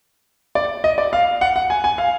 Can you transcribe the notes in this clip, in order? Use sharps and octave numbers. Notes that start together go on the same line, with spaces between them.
D5
D#5
D5
F5
F#5
F#5
G#5
G#5
F5